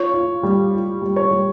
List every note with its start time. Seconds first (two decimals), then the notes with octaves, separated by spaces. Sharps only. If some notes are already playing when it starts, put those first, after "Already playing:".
Already playing: F4 C#5
0.14 F4
0.43 G3
0.73 F4
1.02 G3
1.16 C#5
1.31 G3